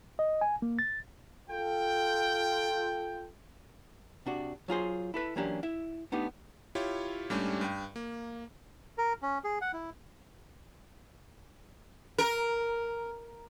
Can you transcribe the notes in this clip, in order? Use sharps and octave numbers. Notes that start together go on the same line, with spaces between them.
D#5
G#5
A#3
A6
F4 A4 G5
C3 D4 F#4
F#3 F4 G#4 C5
E4 A4 B4
E3 F#3 A#3 C#4 D4 G4
E4 E5
A3 B3 D4 D#4 G4
E4 F4 G4 C#5
G#2 G3 A3 C#4 D4 G4
G2 G5
A#3
A#4
C#4
G#4
F#5
E4
A#4